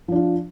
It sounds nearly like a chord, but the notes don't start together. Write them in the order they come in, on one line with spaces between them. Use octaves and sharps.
F3 D4 F4